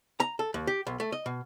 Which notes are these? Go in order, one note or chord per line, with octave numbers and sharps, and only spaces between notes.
A#5
A4
D#2
G4
B1
A3
D#5
B2